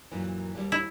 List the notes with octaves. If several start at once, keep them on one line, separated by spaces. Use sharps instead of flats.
F#2 A#2 E3
D#2 G3
E4